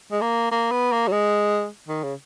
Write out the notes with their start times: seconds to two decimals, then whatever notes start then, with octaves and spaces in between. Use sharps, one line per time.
0.12 G#3
0.22 A#3
0.52 A#3
0.71 B3
0.92 A#3
1.07 F#3
1.12 G#3
1.88 D#3
2.03 C#3